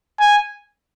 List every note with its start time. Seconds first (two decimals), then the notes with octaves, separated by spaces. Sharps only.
0.20 G#5